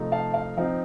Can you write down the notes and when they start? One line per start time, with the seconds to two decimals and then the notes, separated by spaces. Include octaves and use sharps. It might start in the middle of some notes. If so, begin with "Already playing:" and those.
Already playing: C3 F3 A3 D#4
0.12 F5 A5
0.34 F5
0.57 F3 C4 D#4 F5